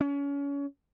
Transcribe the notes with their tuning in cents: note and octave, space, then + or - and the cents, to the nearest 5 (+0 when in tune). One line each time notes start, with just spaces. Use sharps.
C#4 +30